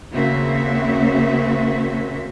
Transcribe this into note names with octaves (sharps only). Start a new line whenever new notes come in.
D#2 C#3 A#3 C4 F#4 E5